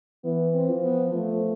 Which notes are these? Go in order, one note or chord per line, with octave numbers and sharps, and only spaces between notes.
E3 B3
C4
F3
B3
F3 A3